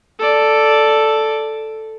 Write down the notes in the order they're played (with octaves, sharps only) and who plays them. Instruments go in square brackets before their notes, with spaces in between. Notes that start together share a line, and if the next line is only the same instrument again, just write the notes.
[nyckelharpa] A4 D5